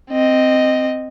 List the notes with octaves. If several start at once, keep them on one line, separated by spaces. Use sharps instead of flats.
C4 D#5